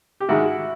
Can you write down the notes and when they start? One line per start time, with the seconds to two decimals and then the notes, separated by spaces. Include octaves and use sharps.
0.20 G4
0.29 G#2 D#3 G#3 E4 F#4